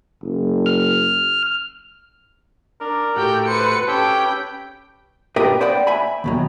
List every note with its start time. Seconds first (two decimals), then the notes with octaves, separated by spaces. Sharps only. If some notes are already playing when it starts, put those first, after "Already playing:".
0.22 F#1
0.66 F6
2.81 D4 A#4
3.16 A2 F#4 G4 G5
3.48 B4 C5 C#7
3.88 C#4 G4 A4 B4 G5
5.36 G4 A#4 B4 D#5 E5 G5
5.61 C5 D5 D#5 F#5 G5 B5
5.87 E5 G#5 B5
6.24 D#2 B2 F#3